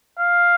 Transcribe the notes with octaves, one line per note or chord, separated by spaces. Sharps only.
F5